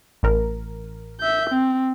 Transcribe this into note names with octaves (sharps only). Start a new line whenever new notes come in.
A1 A#4
E5 G6
C4